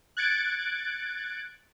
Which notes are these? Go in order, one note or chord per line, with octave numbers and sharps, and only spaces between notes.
F#6 G#6 A6 C#7 D7